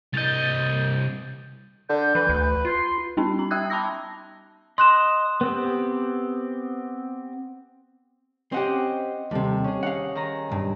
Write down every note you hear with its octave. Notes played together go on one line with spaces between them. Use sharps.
C2 D#5 G6 A6
D3 G6
E3 B4
D2
F4 C6
G3 B3 C#4 D#4
A#5
E5 G5 D#6 E6 F#6 G#6
A5 B5 C6 D6 E6 A#6
D#5 C6 F#6 E7
B3 C4 G4
C4 C#4 G4 C5 D#5 F#5
D#2 C3 G3 A4
C#4 G#4
D#4 F5 F#5
D#3 G#4 A#5
B1 G2